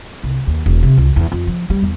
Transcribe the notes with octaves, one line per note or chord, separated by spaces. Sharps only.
C2
D#2
E1
C3
C#2
E2
F2
F3
G3
E2